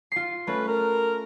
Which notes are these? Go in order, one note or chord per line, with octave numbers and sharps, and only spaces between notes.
F4 C7
A3 C#4 B4
A#4